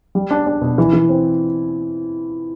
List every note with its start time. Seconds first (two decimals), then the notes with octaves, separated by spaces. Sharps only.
0.15 G3
0.31 D4
0.47 D4
0.62 B2
0.78 E3
0.93 E3
1.09 C4